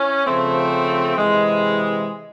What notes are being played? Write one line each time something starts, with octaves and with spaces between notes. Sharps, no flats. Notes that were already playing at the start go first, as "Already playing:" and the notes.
Already playing: C#4 E4
C#3 F3 A3 C4
C3 E3 G#3